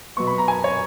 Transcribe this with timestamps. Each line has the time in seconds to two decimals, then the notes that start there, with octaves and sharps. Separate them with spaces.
0.17 B2 F#3 B3 C#6
0.27 B5
0.38 A#5
0.48 G#5
0.64 C#5